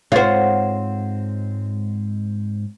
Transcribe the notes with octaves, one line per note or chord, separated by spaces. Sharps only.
G#2 G#3 C4 F4 C5 C#5 F#5